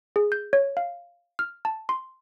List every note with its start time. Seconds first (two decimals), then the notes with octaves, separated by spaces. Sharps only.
0.16 G#4
0.32 G6
0.53 C#5
0.77 F5
1.39 F6
1.65 A5
1.89 C6